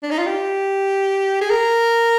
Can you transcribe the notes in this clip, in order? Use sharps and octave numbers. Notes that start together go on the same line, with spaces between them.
D4
D#4
F4
G4
G#4
A#4